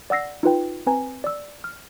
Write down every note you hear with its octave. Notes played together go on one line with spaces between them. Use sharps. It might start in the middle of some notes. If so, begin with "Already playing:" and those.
D5 F#5 E6 A#6 C7
D#4 F4 B4 G5
C4 B4 G#5 A#5
D5 E6
F6